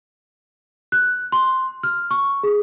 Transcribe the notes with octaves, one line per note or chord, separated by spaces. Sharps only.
F#6
C6
F6
C#6
G#4